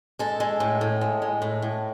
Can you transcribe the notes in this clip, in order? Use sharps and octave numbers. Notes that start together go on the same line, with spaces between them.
G#3 A4
G#3
A2
A2
G#3
G#3
A2
A2